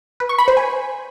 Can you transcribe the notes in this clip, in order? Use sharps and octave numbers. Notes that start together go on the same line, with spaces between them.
B4
C#6
B5
C5
G#5